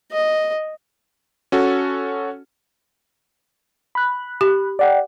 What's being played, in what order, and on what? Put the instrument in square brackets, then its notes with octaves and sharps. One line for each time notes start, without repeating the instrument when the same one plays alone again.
[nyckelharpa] D#5
[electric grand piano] C#4 F#4 A4
[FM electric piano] B5 F#6
[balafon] G4
[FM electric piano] D5 F#5 G5